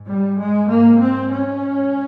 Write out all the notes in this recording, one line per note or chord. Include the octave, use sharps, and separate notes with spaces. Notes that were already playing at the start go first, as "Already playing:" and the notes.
Already playing: G#2
G3
G#3
G#2 A#3
C4
C#4